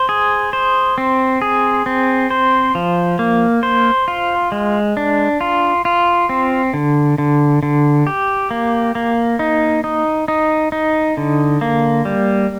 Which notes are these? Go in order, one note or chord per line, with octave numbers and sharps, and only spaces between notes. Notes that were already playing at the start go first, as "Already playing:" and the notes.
Already playing: C5
G#4
C5
C4
G#4
C4
C5
F3
A#3
C5
F4
G#3
D4
F4
F4
C4
D3
D3
D3
G4
A#3
A#3
D#4
D#4
D#4
D#4
D3
A#3
G3